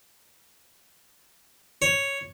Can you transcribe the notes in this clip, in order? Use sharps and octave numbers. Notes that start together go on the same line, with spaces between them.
C#5